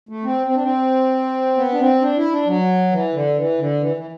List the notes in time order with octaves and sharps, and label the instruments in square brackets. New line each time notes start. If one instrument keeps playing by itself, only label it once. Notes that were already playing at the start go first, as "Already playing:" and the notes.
[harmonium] A3
C4
C4
D4
C4
B3
D4
C4
D4
E4
D4
F#3
E3
D3
E3
D3
E3
E3